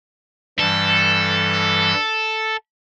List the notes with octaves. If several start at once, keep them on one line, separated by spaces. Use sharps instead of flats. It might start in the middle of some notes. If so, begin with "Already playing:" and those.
G2 E3 G3 A4